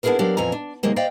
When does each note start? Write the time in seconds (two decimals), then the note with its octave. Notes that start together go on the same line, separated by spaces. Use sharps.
0.03 B3 D4 E4 G#4 A#4 B4
0.19 F#3 D4 G4 A#4 D5 F5
0.37 F2 A#2 E3 F3 G#5 A#5
0.52 D4
0.83 C3 D#3 F#3 G#3 A#3 G4
0.96 C5 D5 D#5 F5 G5